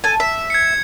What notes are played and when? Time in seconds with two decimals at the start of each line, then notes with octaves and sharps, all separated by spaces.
0.04 A4 G#5
0.20 E5
0.50 G#6 C#7